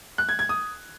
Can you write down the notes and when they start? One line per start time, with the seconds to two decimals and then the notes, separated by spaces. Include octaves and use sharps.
0.18 F#6
0.29 G#6
0.39 G#6
0.49 D#6